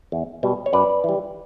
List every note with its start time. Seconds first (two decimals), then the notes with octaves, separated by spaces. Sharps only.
0.12 E2
0.43 B2 G3
0.66 C#5
0.73 F#2 B4 D5
1.04 E3 G3